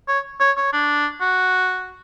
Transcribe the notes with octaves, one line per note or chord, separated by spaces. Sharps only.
C#5
C#5
C#5
D4
F#4